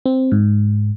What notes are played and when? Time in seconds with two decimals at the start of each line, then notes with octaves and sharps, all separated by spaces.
0.06 C4
0.32 G#2